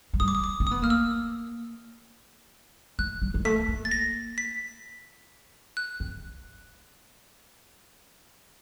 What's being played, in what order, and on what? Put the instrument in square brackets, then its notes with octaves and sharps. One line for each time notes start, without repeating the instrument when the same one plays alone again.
[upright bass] F#3
[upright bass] G3 [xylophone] D#6
[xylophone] D6
D#6
D6
[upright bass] C4
[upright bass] B3 [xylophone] D#6
[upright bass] A#3 [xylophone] F6
[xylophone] E6
[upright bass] G#3 [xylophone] F#6
[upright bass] G3
G#3
[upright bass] A3 [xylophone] B6
[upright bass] A#3
[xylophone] A6
A#6
B6
F#6
[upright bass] C4